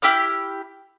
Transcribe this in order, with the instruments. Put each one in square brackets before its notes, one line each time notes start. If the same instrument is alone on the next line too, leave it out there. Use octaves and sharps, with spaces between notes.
[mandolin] E4 G4 D6 F6